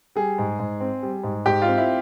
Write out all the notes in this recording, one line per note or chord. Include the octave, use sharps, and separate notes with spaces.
G3 G#4
G#2
G#2
C4
G3
G#2
G#2 G4
F4
C4
E4